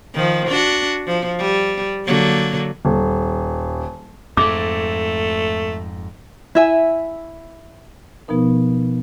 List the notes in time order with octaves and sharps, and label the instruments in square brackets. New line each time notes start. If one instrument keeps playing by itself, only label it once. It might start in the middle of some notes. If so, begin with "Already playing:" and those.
[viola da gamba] D#3 F3
D4 F#4
F3
G3
D3 F#3 A#3
[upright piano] D#1
[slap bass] F2 G#2 [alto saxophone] A3 [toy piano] D6
[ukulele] E4 E5 G#5
[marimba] B2 F3 B3 D#4 A#4